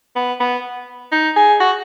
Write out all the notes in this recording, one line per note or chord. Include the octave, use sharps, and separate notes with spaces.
B3
B3
D#4
G#4
F#4